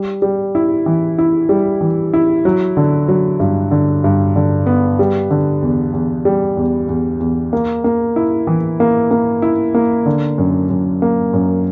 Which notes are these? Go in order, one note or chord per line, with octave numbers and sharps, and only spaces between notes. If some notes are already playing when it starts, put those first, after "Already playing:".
Already playing: G3
G3
E4
E3
E4
G3
E3
E4
F#3
D3
F#3
G2
D3
G2
D3
B3
G3
D3
E2
E2
G3
E2
E2
E2
A#3
A#3
E4
E3
A#3
A#3
E4
A#3
D3
F#2
F#2
A#3
F#2